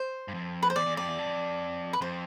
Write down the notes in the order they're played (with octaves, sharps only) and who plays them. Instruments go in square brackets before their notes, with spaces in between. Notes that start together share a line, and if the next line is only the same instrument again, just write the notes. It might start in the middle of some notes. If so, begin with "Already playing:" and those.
Already playing: [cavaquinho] C5
[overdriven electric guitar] G2
F2
[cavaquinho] B4
C5
[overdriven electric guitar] E2 [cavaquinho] D5
[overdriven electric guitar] E2
[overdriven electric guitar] F2 [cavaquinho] D5
[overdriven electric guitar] E2
F2
[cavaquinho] B4
[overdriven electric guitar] F2 [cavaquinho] C5